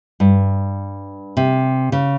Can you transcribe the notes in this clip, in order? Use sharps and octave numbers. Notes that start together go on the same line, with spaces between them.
G2
C3
C#3